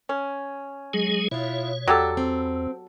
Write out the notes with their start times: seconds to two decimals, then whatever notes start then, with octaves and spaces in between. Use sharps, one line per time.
0.09 C#4
0.93 F#3 G#3 G#4
1.31 B2 E4 F4 C#5
1.88 E2 F#3 D4 G4 A4
2.17 C4